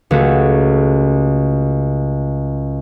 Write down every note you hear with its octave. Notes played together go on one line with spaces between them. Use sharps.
C#2 A3 F#4